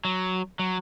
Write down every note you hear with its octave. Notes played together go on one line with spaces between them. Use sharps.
F#3
F#3